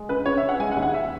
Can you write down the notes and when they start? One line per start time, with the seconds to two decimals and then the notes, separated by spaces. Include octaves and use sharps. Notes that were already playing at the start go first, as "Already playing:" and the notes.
Already playing: G#3
0.09 C#3 B4
0.26 C#3 C#5
0.37 E5
0.43 C#3
0.49 F#5
0.60 G#3 G#5
0.72 F#5
0.77 D#2
0.82 F#5
0.94 E5